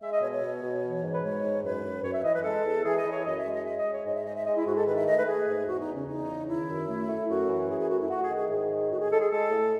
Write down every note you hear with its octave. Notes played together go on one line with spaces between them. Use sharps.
G#3 E5
D#5
B2 C#5
C#5
B2
B2
E3
G#2
B4
G#3 C#5
G#2
F#2 B4
F#2
F#2 C#5
E5
E3 D#5
B4
G#3 A4
E2
E3 G#4
D#5
E3
C#5
F#2 D#5
E5
G#3
D#5
G#3 E5
D#5
G#3
C#5
G#2 D#5
E5
G#3 D#5
E5
G#3 D#5
E4
G#2 F#4
A4
D#3 B4
E5
A3 D#5
B4
A3 G#4
G#2
E2 F#4
D#4
C#3
C#4
E2 D#4
C#3
D#3 E4
F#2
A3
A3
F#2 F#4
E3
F#2 G#4
G#4
A3 F#4
E4
A3 F#4
G#4
D#3
G#4
G#2 G#4
D#3
A2 F#4
G#4
G#3 A4
G#4
G#3 A4
A2